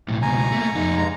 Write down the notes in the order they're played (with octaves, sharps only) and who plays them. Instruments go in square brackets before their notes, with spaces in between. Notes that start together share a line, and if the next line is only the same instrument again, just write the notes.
[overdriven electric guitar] B1 A2
[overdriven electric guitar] C#2 B2 [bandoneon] G#5 A#5
[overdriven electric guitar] A3 A#3
F2 D#4
[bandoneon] G2 G#3 A#5